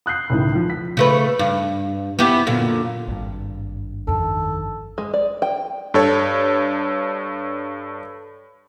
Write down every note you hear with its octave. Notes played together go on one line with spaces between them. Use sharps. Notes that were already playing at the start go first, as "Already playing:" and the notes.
D#6 F#6 G6 C7
C#2 A2 D#3
F3
B6
C#3 A3 B4
G2
B3 E4 G4
F#2 A#2 D3
G#1 G2
F2 D#3 A4
G#3
D5
G5
G2 A4 C#5